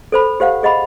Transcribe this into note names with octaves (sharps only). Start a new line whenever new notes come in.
A4 C5 B5
G4 C5 F5 F#5
G#4 D#5 F#5 B5